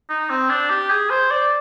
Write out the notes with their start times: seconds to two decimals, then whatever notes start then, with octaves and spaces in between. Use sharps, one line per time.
0.10 D#4
0.30 C4
0.49 D4
0.70 G4
0.90 G#4
1.10 C5
1.31 D5